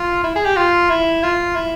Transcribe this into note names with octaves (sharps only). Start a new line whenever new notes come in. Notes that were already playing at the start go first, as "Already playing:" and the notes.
Already playing: F4
E4
G#4
G4
F4
E4
F4
E4